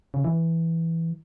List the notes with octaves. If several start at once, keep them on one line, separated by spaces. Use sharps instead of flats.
C#3
E3